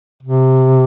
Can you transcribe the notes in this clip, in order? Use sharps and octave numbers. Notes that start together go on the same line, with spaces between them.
C3